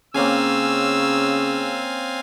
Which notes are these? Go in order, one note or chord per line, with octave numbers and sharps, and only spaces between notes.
C#3 A#3 C4 C#4 F5 G#5 E6